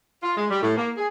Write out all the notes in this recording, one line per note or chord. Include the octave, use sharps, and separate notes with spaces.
F4
G#3
G3
A2
A#3
G#4